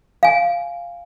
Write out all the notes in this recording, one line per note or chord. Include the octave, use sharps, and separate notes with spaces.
F5 G#5